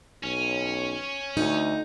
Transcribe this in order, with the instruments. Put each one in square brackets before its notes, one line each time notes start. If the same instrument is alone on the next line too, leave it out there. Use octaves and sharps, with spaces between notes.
[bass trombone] B1 [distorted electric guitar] C#4
[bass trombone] D2 [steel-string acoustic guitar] D#4